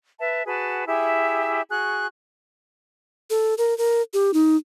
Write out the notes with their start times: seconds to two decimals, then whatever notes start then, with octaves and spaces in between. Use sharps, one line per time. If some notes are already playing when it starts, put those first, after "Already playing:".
0.20 B4 E5 A5
0.46 F#4 G#4 B4 A5
0.87 E4 G4 G#4 E5
1.69 F#4 G#4 C#6 F#6
3.30 A4
3.58 A#4
3.78 A#4
4.14 G4
4.34 D#4